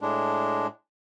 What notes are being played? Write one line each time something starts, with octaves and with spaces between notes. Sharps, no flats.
A2 G#3 D4